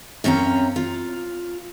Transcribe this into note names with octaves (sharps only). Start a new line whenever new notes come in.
F#2 C4 C#4 F5 A#5
F4